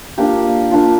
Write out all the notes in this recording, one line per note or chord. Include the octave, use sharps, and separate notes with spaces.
A#3 D4 F4 G4
A#3 D4 F4